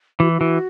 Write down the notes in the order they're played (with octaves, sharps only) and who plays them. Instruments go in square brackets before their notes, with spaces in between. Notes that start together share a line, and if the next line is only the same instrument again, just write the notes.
[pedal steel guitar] E3 [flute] F#4
[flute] E4
[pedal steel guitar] E3 [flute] F#4